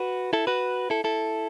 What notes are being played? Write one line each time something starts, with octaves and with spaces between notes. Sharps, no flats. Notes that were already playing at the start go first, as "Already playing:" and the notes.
Already playing: F#4 B4
E4 A4
F#4 B4
E4 A4
E4 A4